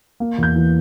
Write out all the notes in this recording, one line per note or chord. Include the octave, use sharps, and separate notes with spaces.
A#3
E2 G6
E3